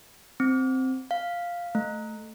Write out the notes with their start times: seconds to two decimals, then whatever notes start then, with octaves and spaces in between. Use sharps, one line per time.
0.40 C4
1.11 F5
1.75 A3